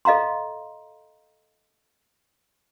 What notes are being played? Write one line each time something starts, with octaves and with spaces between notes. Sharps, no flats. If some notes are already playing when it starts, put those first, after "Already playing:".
A4 D#5 F5 A#5 C6